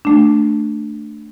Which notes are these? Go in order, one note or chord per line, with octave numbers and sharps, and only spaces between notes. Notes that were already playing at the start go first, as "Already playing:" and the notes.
A3 D4